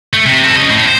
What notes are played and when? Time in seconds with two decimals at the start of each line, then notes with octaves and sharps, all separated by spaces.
0.13 A3
0.26 C3
0.44 C4 A4
0.57 C#4 D#5
0.70 A2
0.86 C5